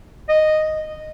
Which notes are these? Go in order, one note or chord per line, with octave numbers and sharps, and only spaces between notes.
D#5